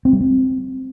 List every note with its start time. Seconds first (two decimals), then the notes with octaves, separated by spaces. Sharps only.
0.05 C4
0.13 G3
0.21 C4